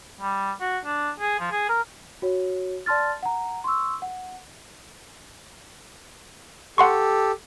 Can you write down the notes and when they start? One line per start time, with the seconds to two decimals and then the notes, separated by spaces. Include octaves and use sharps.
0.20 G3
0.60 F#4
0.85 D4
1.20 G#4
1.39 F3
1.51 G#4
1.69 A#4
2.22 F#4 C#5
2.86 D5 A5 C6 F6 A6
3.23 F#5 A#5
3.64 C6 C#6 E6
4.02 F#5
6.78 G4 A4 F#5 C6 C#6